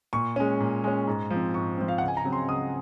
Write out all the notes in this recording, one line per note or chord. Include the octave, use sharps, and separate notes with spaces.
A#2 C#6
G#3 C#4
A#2
G#3 C#4
G#2
F3 C4
G#2 C#6
F3 C4
F5
C#2 F#5
G#5
A#5
C#3 F#3 C4
C6
C#2 D#6